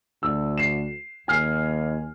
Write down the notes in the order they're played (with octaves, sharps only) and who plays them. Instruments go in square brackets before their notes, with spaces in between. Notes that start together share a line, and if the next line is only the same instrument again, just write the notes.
[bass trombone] D2 [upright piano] E6
[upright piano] C7 E7
[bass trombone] D#2 [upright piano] G#5 F6 C7